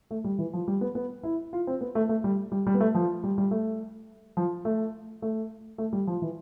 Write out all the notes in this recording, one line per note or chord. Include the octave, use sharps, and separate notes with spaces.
A3
G3
E3
F3
G3
B3
B3
E4
F4
C4
B3
A3
A3
G3
G3
G3
B3
A3
F3
G3
G3
A3
F3
A3
A3
A3
G3
F3
E3